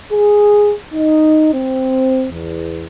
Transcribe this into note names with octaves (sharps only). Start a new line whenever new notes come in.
G#4
D#4
C4
E2